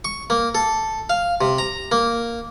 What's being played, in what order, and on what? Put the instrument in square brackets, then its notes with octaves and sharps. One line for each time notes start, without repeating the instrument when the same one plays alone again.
[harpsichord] C#6
A#3
A4
F5
C3
A#5
A#3